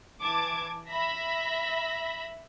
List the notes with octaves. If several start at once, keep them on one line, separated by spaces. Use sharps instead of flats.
E3 A5 D6 G#6
E5 B5 A#6 B6